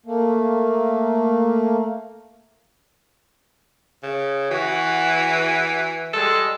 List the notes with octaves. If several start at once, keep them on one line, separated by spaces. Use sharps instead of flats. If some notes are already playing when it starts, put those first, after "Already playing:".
A3 A#3
C#3
E3 F#4
G3 G#3 A4